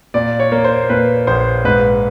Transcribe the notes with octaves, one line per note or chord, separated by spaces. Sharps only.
A#2 D5
C#5
A#3
C5
A#2 B4
A#1 C5
G#2 B4